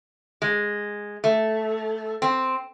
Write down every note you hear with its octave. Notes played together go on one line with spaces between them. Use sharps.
G#3
A3
C4